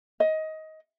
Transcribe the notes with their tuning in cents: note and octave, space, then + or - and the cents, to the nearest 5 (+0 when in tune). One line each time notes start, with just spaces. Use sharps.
D#5 +20